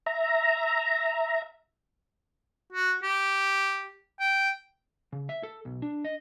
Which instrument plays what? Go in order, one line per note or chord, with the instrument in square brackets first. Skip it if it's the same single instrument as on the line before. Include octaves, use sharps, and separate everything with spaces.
[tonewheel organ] E5 A#5
[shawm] F#4
G4
G5
[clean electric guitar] C#3
E5
A4
B1
D4
D#5